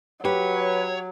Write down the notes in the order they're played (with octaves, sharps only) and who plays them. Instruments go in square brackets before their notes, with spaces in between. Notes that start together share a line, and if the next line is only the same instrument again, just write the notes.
[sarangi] F#3 [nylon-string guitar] G4 [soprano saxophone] B4 [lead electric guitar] C#5